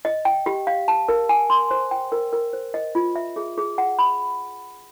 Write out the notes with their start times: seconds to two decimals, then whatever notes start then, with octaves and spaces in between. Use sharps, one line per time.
0.05 D#5
0.25 G5
0.46 G4
0.67 F5
0.88 A5
1.09 A#4
1.29 G#5
1.50 C6
1.71 C5
1.91 G5
2.12 A#4
2.33 A#4
2.53 C5
2.74 D#5
2.95 F4
3.16 E5
3.36 G#4
3.58 G#4
3.78 F#5
3.99 B5